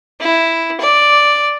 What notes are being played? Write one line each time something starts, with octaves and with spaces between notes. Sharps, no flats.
E4
D5